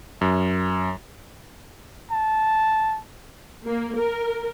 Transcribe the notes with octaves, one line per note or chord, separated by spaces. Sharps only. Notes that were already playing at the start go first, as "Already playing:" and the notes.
F#2
A5
A#3
A#4